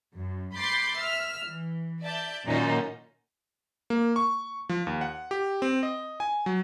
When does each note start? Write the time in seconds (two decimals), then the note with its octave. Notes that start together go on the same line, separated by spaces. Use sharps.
0.15 F#2
0.55 B5 C6 D6 G6 A6 C7
0.99 E5 E6 F6
1.48 E3
2.02 D5 E5 A5 G6
2.45 F#2 A#2 D#3 C#4 D#4
3.90 A#3
4.16 C#6
4.69 F3
4.87 D#2
5.01 F#5
5.31 G4
5.62 C4
5.83 D#5
6.20 G#5
6.46 F#3